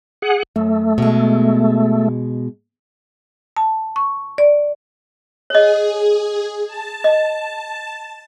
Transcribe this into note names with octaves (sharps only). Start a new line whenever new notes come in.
G#4 F#5
F#2 A3
B2 G#3
A5
C#6
D5
G#4 C#5 D#5
A5
D#5